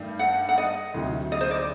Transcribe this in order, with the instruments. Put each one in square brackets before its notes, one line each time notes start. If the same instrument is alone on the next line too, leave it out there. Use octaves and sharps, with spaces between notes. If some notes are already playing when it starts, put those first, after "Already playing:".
Already playing: [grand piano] G2 D#3 A3
[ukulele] F#5
F#5
D#5
[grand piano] D2 C3 D#3 F#3
[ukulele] D#5
C5
D5